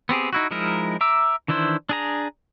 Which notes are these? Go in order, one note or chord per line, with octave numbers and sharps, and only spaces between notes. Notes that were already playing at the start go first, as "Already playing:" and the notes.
B3 C4 G4 G#4
D#4 E4 F#4
F3 G#3 D#4 E4 A#4
E5 A#5 D6 E6
D#3 E3 D4 E4 C5
D4 G#4 A#5